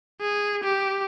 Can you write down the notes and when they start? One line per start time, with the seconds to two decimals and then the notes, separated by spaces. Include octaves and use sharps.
0.21 G#4
0.63 G4